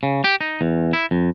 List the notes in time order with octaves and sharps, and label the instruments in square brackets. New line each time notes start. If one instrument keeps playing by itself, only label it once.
[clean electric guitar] C#3
G4
D#4
E2
E4
F2